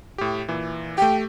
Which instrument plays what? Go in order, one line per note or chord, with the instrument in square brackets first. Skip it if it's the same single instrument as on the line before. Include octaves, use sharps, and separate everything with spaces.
[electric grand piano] A2 G4
A#2 E3
[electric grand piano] A3 G4 [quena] G5